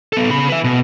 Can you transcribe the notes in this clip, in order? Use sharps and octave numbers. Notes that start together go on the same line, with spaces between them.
B3 A4
C#3 B5
B4 E5
B2